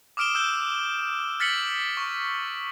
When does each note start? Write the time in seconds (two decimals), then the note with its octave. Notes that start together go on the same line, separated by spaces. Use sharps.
0.17 D6 D#6 F6 D7 E7 G7
0.35 E6 G6 G7
1.40 F6 A6 B6 C#7 F#7 G7
1.97 C#6